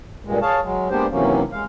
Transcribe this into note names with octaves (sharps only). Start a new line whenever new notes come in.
G2 A#2 G#3
G#4 C#5 F5 A5
F#3 G#3
G#3 A#3 B3 D4 G4 C5
D#2 C3 E3 F#3 A#3 C#4
G#3 F5